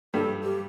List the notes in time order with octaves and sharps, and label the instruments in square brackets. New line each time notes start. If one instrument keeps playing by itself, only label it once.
[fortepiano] G2 G3 [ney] A4
[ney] G4